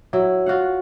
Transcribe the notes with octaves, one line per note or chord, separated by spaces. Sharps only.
F#3 E4
F4 F#4 F5 F#5